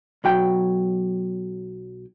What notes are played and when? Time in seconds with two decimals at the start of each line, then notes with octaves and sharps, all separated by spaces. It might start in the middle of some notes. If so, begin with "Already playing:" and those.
0.24 B1 F#3 G5